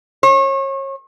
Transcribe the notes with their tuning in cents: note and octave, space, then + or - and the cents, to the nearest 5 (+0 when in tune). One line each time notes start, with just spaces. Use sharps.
C#5 -35